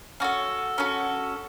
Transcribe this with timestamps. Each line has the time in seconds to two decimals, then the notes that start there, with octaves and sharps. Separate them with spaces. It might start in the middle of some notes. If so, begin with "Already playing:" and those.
0.20 C#4 F#4 A4
0.78 C#4 F#4 A4